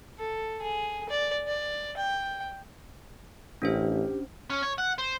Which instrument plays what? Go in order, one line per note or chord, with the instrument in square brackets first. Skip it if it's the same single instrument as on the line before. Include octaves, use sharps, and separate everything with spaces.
[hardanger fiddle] A4
G#4
D5
D5
G5
[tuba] A1 [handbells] C#4 D4 C5 [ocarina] G4
[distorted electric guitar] C#4
C#5
F#5
C5